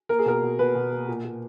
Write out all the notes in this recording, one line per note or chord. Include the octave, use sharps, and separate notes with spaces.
A#3 A#4
G#4
B2 A#4
B2
B2 B4
B2
A#3
A#2
A#2